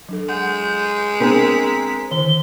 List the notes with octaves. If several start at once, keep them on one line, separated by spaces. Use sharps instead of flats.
F#3 D4 A4
G#3 F#5 G6
B3 C4 D4 G#4 A#4 B6
D3 D#3 G7